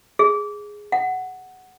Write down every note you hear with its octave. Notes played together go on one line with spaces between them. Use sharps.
G#4
F#5